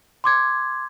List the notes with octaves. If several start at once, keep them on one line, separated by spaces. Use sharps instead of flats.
C6 D6 G#6